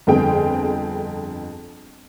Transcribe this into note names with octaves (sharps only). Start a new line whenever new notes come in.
G1 F2 D3 C4 G#4 G5